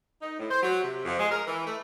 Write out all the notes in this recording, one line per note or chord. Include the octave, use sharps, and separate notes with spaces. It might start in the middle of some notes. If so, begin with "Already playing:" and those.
D#4
A2
C5
F#3
C3
F2
G#3
A#4
E3
A3